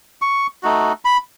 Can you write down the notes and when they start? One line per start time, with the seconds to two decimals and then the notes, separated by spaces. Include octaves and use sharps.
0.22 C#6
0.63 A3 D#4 F#4
1.05 B5